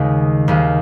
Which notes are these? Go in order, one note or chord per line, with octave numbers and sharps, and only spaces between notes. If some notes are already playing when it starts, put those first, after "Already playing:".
Already playing: D#2 C#3 G#3
D#2 C#3 G#3